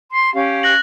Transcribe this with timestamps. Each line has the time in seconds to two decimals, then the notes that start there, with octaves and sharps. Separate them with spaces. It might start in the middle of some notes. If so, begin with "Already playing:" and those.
0.12 C6
0.34 C#4 G4 F5
0.63 F#6 A#6 F#7